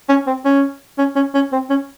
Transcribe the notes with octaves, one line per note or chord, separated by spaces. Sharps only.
C#4
C4
C#4
C#4
C#4
C#4
C4
C#4